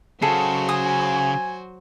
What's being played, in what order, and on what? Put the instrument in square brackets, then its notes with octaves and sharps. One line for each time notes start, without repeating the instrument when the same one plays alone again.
[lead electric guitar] C#3 [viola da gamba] F#3 F#4 C5 [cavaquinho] G#4 A4 D#5
[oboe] G#5 [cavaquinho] D#6